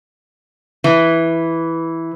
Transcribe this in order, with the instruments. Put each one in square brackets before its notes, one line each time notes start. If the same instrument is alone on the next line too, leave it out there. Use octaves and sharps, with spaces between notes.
[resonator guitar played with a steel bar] E3